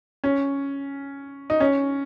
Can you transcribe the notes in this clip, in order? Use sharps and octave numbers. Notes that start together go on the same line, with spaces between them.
C#4
D#4
C#4